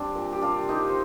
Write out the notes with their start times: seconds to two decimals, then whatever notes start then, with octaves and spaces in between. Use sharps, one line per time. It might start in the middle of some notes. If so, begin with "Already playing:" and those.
Already playing: G3 C4 D4
0.15 A#2
0.32 G4
0.42 C3 D4 F4
0.69 D#3 D#4 G4
0.89 C5